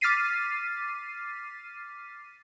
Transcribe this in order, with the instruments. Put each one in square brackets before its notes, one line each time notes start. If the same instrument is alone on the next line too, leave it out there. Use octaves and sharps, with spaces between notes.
[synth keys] D6 F6 A6 B6 C7 D#7